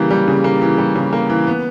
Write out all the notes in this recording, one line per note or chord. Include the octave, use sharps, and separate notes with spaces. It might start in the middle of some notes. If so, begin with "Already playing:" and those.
Already playing: C#3 E3 G3 A#3
G3
C#3
A#3
E3
G3
C#3
A#3
E3
B3